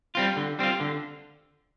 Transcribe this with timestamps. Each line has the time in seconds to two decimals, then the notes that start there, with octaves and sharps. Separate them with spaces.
0.15 G3 C4 F4
0.37 D3
0.59 G3 C4 F4
0.80 D3